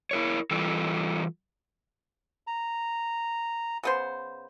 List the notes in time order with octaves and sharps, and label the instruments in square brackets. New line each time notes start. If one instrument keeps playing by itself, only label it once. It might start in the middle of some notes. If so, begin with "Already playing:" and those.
[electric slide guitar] E4 A#4 C#5
E3 G3 F4 A4
[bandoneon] A#5
[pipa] C#3 B3 C5